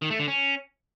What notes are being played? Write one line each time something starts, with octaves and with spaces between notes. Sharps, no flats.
D#3
A3
D3
C#4